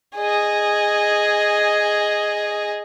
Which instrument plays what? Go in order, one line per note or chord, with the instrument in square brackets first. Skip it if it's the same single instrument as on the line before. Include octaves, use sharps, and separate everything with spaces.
[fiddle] G#4 D#5